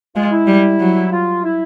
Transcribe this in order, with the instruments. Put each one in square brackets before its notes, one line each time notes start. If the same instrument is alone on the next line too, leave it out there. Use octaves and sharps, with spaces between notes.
[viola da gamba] G#3 [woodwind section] F4
[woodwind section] E4
[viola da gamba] G3
F#3
[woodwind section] F4
E4